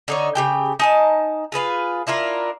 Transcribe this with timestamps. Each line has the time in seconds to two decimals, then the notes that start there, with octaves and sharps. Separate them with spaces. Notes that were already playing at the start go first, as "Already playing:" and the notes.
0.08 D3 D#4 C#5
0.35 C#3 G4 G5
0.79 D#4 G#5 A5
1.52 F4 G#4 B4 F5
2.07 D4 E4 F4 A#4